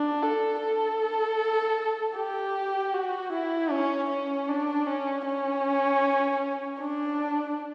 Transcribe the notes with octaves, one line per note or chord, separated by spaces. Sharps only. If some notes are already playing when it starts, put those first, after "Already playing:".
Already playing: D4
A4
A4
G4
F#4
E4
C#4
C#4
D4
C#4
C#4
D4